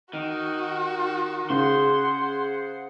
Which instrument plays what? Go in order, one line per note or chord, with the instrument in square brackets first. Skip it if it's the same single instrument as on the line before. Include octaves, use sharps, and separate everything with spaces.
[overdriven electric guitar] D#3 [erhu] F#4
[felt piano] C#3 [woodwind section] G#4 C5 F#5 [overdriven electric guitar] C6